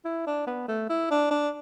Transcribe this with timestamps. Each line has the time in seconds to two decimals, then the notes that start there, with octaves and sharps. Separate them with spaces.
0.05 E4
0.27 D4
0.47 B3
0.68 A3
0.90 E4
1.11 D4
1.31 D4